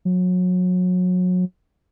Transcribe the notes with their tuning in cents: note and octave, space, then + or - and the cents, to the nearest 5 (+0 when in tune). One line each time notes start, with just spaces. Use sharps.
F#3 -30